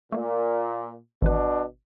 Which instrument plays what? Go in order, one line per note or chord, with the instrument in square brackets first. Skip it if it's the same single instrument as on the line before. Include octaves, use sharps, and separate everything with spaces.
[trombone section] A#2 [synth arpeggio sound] A3 A#3
[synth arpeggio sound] G#1 E3 B4 [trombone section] B2 D4